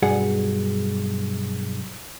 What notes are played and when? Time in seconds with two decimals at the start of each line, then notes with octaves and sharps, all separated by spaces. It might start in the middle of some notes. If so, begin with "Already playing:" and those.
0.02 B1 G2 G#4 F#5